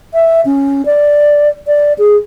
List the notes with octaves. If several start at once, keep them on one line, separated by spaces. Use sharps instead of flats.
E5
C#4
D5
D5
G#4